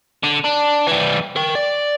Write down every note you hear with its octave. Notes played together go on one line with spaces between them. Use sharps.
D3
D4
E3 G3
A#4 G5
D5